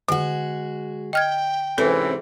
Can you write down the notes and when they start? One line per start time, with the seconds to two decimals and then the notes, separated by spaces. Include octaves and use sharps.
0.08 D3 G#3 F#4
1.13 D#5 G5 F6 G#6
1.78 G#2 C3 E3 C4 C#4 A4